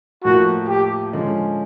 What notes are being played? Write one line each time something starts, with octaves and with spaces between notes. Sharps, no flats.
A2 F3 A#3 F#4
G4
D3 F3 G#3 C#4